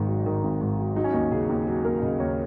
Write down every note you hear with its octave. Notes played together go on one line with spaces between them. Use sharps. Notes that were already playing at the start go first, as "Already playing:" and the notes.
Already playing: G#1 G#2 D#3
F#3
D#3
G#1
G#2
F#3
F#3 D#4
C#4
D#2 D#4
C#3 G#4
D#2
F#3
D#2 A#4
C#3 D#5
D#2 C#5